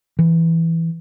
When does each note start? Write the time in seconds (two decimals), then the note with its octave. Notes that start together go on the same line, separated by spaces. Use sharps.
0.19 E3